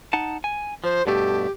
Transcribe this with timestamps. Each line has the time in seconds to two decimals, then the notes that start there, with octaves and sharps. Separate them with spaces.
0.13 D#4 F#5 A5
0.44 G#5
0.84 F3 C5
1.07 G2 B2 A3 G4